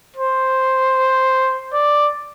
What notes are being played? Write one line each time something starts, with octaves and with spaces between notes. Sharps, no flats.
C5
D5